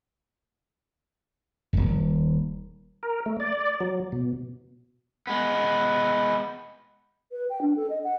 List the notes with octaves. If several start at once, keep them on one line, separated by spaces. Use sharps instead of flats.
D#1 G#1
A#4
A3
D5
F#3
B2
G#3 B3
B4
G5
D4
A4
D#5
F#5